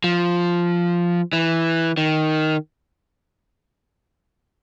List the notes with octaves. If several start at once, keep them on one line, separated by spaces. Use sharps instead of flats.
F3
E3
D#3